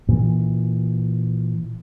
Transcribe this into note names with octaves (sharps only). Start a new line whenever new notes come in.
A#2 E3